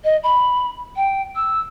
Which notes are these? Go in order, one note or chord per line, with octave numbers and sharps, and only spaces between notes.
D#5
B5
G5
E6